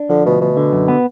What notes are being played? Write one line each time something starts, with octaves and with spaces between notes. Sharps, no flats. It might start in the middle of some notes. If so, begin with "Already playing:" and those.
Already playing: D4
D3 F3
D2 B2
D2 B2
D3
F#2
B3